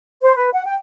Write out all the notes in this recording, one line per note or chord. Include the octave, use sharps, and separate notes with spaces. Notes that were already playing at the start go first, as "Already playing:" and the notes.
C5
B4
F#5
G5